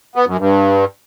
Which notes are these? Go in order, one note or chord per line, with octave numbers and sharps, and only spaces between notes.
B3
F#2
G2